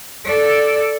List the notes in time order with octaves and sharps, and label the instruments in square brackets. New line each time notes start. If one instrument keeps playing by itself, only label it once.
[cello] A4 D5